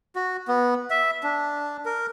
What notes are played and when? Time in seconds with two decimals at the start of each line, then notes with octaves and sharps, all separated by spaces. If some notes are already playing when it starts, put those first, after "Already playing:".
0.16 F#4
0.48 B3
0.90 E5
1.23 D4
1.85 A#4